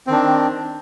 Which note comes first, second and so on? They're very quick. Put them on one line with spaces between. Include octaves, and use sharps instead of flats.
C4 D#3 D4